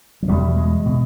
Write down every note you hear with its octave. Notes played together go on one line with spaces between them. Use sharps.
F#3
E2 B2 G3
G#3
B2